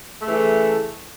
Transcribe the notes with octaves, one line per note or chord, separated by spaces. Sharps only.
C#3 E3 A3